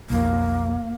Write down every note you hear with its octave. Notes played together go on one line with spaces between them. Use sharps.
B1 F2 A#3